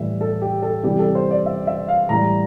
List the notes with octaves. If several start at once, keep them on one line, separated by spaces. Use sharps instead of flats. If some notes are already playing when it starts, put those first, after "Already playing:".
Already playing: A2 E3 G3 E5
A4
G4
A4
C3 E3 G3 G4
A4
C5
D5
E5
E5
F5
A2 E3 G3 A#5